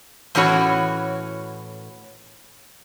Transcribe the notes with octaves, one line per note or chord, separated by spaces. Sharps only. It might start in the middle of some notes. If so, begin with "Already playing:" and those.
A2 E3 C#4 F#4 C#5